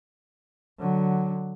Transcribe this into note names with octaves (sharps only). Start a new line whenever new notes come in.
D3 F#3